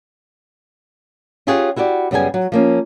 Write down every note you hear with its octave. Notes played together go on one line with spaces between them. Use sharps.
C#4 F4 G4 G#4 C#5 F#5
E4 F#4 G4 A#4 D5
F#2 C#3 G3 B3 G#4 G#5
F#3
F3 A#3 C#4